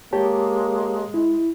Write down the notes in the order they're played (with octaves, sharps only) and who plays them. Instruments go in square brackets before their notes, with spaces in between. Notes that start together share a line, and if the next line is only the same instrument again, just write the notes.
[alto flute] G#3 [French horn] A#3 [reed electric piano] G4 C#5 A5
[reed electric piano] E4